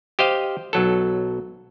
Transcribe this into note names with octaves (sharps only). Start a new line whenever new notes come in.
G4 C5 D#5 F5
B1 F#3 A4